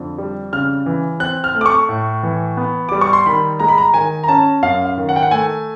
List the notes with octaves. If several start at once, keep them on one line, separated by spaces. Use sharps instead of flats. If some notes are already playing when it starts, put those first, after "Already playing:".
Already playing: F2 D3
G3
C#3 F6
E3
C4 F#6
F6
A3
D6
C#6
A2
E3
B3
G3 D6
C#6
C6
D#3 B5
G#3 A#5
B5
A#5
D#3 G#5
A#5
C#4 A5
F#2 F5
F5
D#3
F#5
G5
F#5
A3 G#5